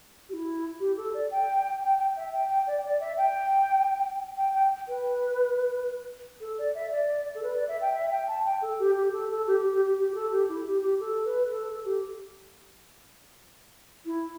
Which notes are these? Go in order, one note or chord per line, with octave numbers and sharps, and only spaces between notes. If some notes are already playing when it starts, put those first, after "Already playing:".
G4
E4
G4
A4
D5
G5
G5
G5
E5
G5
G5
D5
D5
E5
G5
G5
G5
B4
A4
D5
E5
D5
A4
B4
D5
E5
G5
E5
G5
A5
G5
A4
G4
G4
A4
A4
G4
G4
G4
G4
G4
G4
A4
G4
E4
G4
G4
A4
B4
A4
A4
G4
E4